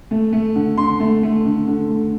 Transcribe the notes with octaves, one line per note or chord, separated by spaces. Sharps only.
A3
A3
D3
D3 C6
A3
A3
D3
D3
A3